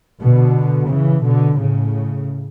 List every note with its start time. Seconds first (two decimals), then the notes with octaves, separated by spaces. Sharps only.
0.21 B2 D3
0.90 C#3 E3
1.24 B2 D3
1.59 A2 C#3